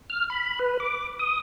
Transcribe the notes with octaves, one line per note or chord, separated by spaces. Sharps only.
F6
B5
B4
D6
D#6